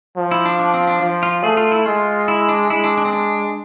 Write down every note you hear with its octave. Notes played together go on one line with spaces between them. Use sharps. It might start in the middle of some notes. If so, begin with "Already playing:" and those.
F3
E4
D4
D4
C4
D4
F3
F4
A3 G#4
F4
E4
G#3 F4
E4
D4
G#3 E4
D4
D4
C4
D4